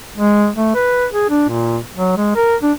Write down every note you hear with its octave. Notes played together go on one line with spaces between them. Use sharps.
G#3
A3
B4
G#4
D4
A#2
F#3
G#3
A#4
D4